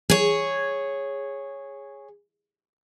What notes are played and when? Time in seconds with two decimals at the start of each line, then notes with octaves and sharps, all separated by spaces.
0.10 G#4 C#5